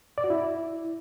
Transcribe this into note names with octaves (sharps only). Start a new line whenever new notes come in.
D5
F#4
E4